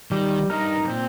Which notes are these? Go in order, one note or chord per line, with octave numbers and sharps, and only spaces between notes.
D#3 G3
G2 D#4 A#4
A#2 C4